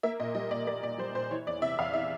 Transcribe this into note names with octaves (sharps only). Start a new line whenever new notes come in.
A#3 E5
A#2 D#5
G3 D#5
A#2 D5
A#3 D5
A#2 D5
G3 C5
A#2 C5
E3 C#5
E2 D5
C3 E5
E2 F5
E3 E5